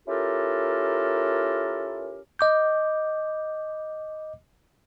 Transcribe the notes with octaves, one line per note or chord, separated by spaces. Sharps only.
C#4 E4 F4 G4 A4 A#4
D#5 D6 G6